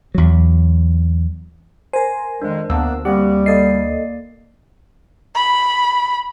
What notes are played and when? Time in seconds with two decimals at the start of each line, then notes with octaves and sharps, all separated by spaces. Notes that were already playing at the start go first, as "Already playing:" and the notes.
0.15 E2 F#3
1.93 A#4 C5 G#5
2.42 F2 D#3 G#3 D4
2.70 D2 A#3 B3 D4 E6
3.05 G3 A#3 C4 G4 F#5
3.46 A#3 A4 D5 D#5 C7
5.35 B5